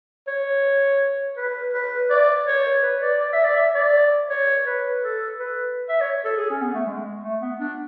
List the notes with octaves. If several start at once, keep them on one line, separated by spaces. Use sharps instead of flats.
C#5
B4
B4
D5
C#5
B4
D5
D5
E5
D5
E5
D5
C#5
B4
A4
B4
E5
C#5
A4
G#4
C#4
B3
A3
G#3
A3
B3
D4